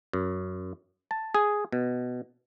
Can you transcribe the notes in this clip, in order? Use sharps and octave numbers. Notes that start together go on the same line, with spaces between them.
F#2
A5
G#4
B2